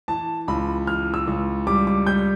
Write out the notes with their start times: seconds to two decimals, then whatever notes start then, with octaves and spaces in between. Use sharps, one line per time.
0.08 E3 A5
0.48 C#2 B5
0.87 E3 F6
1.14 E6
1.27 C#2
1.67 G3 D6
1.87 D6
2.07 G3 G6